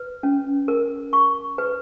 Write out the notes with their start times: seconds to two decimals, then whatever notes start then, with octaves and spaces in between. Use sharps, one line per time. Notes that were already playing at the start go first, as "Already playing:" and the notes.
Already playing: B4
0.23 C#4
0.68 A#4
1.13 C#6
1.58 B4